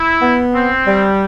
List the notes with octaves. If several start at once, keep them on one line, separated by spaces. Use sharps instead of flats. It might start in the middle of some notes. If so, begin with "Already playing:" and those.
Already playing: E4
B3
C4
G3